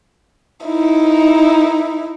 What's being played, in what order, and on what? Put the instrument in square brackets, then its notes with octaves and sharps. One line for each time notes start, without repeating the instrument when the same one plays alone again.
[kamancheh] D#4 E4